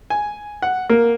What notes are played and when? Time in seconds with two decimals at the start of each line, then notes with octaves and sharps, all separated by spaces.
0.10 G#5
0.62 F#5
0.90 A#3